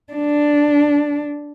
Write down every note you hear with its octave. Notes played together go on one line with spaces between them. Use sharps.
D4